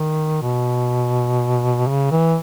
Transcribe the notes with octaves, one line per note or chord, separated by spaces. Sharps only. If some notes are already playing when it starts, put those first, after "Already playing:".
Already playing: D#3
B2
C#3
E3